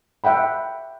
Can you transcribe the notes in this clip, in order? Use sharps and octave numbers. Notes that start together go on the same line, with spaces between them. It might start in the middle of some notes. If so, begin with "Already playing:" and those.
E5 F#5 G5 B5